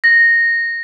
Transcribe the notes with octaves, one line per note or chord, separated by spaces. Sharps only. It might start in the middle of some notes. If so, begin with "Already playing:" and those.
A#6